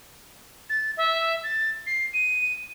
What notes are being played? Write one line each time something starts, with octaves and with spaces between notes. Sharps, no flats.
A6
E5
A6
C7
D#7